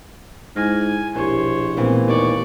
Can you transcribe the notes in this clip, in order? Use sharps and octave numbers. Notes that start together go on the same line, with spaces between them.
G#2 E4 G#5 F6 A#6
A#1 B2 E4 G4 C5 C#5
A#2 E3 A3 B3 C4 A#4
D#2 D5 C#6